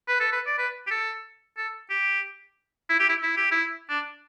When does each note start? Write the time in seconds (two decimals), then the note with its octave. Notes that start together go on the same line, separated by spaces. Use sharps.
0.08 B4
0.20 A4
0.32 B4
0.47 D5
0.58 B4
0.87 G4
0.91 A4
1.58 A4
1.90 G4
2.89 E4
3.00 G4
3.09 E4
3.23 E4
3.37 G4
3.51 E4
3.89 D4